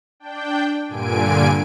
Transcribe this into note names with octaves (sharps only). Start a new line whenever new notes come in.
D4 G5
G2 A#2 D3 G#5 D7